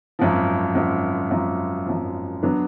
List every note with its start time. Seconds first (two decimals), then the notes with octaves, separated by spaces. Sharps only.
0.19 G#1 F#2 F3
0.75 G#1 F#2 F3
1.31 G#1 F#2 F3
1.86 G#1 F#2 F3
2.42 F#3 B3 D4